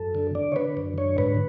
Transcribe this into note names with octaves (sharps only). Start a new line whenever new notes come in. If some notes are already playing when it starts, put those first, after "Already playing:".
Already playing: F#2 A4
D3
D3 D5
C#5
D3 B4
F#2
D3 C#5
G#2 B4